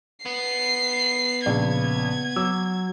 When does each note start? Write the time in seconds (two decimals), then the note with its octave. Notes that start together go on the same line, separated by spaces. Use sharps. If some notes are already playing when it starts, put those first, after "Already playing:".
0.26 B3 C7
1.46 A#1 C#3 G#6
2.36 F#3 D6 E6